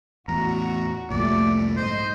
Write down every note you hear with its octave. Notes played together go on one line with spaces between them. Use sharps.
E2 A2 F#4 A#5
C2 F2 A#2 G3 A3 D5
G#2 C5 D#5